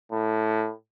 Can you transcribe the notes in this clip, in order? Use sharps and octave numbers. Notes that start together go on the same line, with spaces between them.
A2